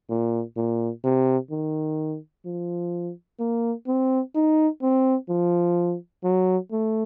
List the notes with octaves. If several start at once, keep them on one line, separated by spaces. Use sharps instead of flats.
A#2
A#2
C3
D#3
F3
A#3
C4
D#4
C4
F3
F#3
A3